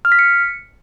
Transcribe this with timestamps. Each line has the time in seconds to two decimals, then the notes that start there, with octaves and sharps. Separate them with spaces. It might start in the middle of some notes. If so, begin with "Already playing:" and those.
0.05 F6
0.12 B6
0.19 C#7